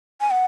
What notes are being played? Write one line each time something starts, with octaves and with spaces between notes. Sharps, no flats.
G#5
F#5